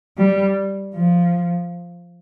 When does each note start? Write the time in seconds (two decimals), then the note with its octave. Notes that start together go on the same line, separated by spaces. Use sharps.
0.17 G3
0.94 F3